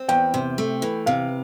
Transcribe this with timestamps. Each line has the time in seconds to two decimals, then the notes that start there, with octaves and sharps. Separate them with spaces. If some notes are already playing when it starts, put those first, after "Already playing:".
Already playing: C4
0.08 E2 G5
0.34 C3
0.58 A3
0.82 E3
1.06 C3 F5